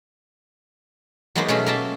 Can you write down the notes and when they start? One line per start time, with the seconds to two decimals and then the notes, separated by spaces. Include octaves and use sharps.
1.35 F#3 G#3 A#3 B3 D#4 C5
1.48 B2 F#3 A3 C#4 G#4 B5
1.66 A#3 A#4 D#5 E5 A5